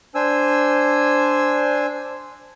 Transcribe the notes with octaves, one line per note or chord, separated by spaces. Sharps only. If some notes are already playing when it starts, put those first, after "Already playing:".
D4 C5 G#5 E6